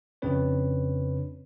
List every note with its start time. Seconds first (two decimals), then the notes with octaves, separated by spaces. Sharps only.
0.22 F2 C#3 C4 D4 B4 C#5